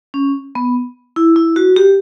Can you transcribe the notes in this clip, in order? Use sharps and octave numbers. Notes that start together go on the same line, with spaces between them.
C#4
B3
E4
E4
F#4
G4